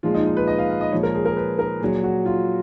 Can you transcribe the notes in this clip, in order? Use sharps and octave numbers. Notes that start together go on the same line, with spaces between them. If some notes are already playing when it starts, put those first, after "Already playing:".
A#2 F3 G#3 F4
D#4
D#4
B4
D#5
F5
F5
D#5
A#2 F3 G#3 C#5
A#4
G#4
A#4
B4
A#4
A#2 F#3 G#4
F#4
F4